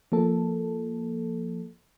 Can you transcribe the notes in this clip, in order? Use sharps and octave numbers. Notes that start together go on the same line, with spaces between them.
F3 A#3 A4